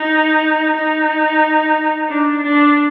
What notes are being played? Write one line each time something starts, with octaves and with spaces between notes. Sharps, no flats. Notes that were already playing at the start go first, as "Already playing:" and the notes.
Already playing: D#4
D#4
D4
D4